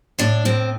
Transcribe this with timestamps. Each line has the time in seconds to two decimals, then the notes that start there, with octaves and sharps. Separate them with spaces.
0.19 A2 D4
0.45 A2 C4